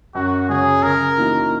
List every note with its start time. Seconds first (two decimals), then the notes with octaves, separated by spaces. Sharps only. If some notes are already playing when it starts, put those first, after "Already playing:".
0.15 F#2 F#4
0.49 C#3 F#3 C#4 G#4
0.83 C#3 A#4
1.18 E3 A#3 D#4 F#4